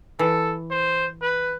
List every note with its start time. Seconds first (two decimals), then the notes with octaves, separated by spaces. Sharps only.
0.19 E3 A4
0.70 C5
1.22 B4